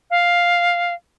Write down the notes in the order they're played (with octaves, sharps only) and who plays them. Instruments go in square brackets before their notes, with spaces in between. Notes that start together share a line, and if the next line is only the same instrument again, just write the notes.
[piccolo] F5